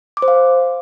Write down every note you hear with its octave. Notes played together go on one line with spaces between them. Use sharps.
D6
C5
F5